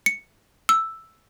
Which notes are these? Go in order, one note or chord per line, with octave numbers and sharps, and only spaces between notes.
C#7
E6